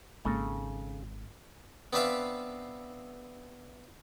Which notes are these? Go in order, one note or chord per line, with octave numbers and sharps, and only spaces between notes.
G#1 C#3 G#3 A#3 A4 A#5
B3 C4 D4 B4 E5 F5